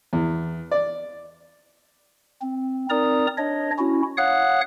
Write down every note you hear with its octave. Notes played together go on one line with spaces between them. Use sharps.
E2
D5
C4
C4 D#4 A#4 D5 A#5 D#6
D4 C#5 D#5
C#4 E4 F#4
C#5 F5 F#5 D#6 F#6